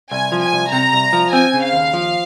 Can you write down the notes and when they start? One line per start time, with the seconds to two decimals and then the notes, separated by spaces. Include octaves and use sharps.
0.11 C2 G#5
0.32 F3
0.42 G#5
0.53 C2
0.72 C3 A#5
0.93 C2
1.13 F3
1.33 C4 G#5
1.54 C#3
1.63 F5
1.73 D#2
1.94 F3